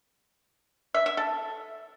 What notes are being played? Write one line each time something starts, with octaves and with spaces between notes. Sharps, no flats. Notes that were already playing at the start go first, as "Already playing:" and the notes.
E5
E5
A4